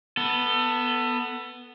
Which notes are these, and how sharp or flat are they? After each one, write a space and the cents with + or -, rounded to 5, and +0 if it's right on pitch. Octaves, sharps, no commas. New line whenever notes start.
B3 +0 A4 +20